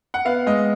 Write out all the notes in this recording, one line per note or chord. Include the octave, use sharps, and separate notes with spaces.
F#5
B3 F5
G#3 D#5